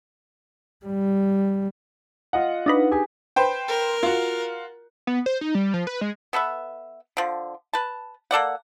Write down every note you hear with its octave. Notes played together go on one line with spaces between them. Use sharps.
G3
F4 D#5 F#5
D4 D#4 B4
G4 G#4 G#5
B4 C5 G5
A#4
F4 F#4
B3
C5
D#4
G3
F3
B4
G#3
B3 A4 B4 E5
D3 F3
B4 A5
A#3 A4 D5 F#5